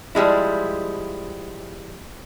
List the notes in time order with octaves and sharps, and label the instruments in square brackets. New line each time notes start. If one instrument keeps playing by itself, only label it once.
[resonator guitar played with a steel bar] F3 G3 G#3 E4